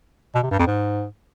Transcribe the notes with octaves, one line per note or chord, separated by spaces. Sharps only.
B2
C3
G2
F2
G#2